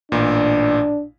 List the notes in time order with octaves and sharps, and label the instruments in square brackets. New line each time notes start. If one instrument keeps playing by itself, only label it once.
[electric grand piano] A1 A#2 [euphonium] D4